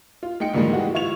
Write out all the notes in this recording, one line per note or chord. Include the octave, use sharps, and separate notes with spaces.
F4
G#3 D#4 G5 C#7
G#2 D3 D#3 F3 G3 G#3
E3 F#4 G4
E4 F4 C#6 G#6 F7